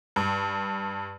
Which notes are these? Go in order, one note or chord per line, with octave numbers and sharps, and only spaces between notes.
G2